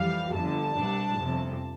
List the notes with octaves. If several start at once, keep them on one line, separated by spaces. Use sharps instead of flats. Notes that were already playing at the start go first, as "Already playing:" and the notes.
Already playing: F2 E3 G3 F5
G1 F2 D3 A5
C2 B2 G3 D4
G1 F2 C3